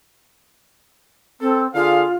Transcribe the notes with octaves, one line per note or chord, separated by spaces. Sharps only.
C4 A4
D3 F4 G#4 F5